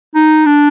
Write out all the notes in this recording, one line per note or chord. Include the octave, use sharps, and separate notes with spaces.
D#4
D4